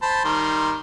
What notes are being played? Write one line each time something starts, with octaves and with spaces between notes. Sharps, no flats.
C5 A5 B5
D#3 G3 C6